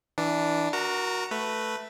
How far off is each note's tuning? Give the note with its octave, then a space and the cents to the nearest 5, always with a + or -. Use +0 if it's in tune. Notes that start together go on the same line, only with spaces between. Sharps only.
E3 -15 D4 +0
F#4 +0 A#4 +15 A#5 -35
A3 +0 B4 +0